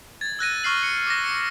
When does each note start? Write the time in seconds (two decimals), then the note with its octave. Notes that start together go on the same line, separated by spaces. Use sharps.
0.21 G#6 A6
0.39 E6 F#6 A#6 D#7
0.63 C#6 F6 C7 F#7
0.83 C#7
1.07 D6 A#6
1.24 C#7